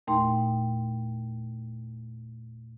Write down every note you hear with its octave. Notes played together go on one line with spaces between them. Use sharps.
E2 A#2 A3 D#4 G5 C6